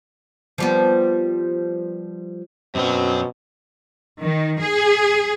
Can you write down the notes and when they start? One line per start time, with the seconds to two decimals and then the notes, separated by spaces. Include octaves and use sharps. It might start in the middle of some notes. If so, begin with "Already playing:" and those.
0.58 F3 G3 B3
2.75 F#2 B2 F#3 C4
4.22 D#3
4.62 G#4